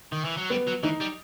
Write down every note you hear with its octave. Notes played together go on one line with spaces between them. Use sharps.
D#3
E3
F#3
G3 B3
F#3
E3 D#4
G3